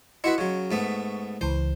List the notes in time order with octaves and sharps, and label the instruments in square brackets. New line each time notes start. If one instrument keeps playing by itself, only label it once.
[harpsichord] E4 F#4 B4 [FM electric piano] D#5 C6 C#7
[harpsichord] C#3 F#3 [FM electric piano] C#6
[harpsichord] G#2 A3 B3
[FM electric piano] C#2 E3 [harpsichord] C5